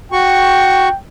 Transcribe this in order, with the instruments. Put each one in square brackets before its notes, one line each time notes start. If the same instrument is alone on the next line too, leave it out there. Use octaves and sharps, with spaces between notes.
[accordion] F#4 C#6 [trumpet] G5